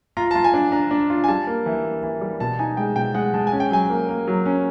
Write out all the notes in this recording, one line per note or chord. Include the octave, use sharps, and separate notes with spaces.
F4 A#5
F4 A5
G#5
D4
D4 A#5
D4
F4
G#5
G3 A5
A#3
E3
A#3
E3
G3
B2 A5
D#4 G#5
G#3 G5
B2 G5
G#3 F#5
G#3 A5
G#5
C#4
G5
F#3 G#5
A#3
A#3
F#3
C#4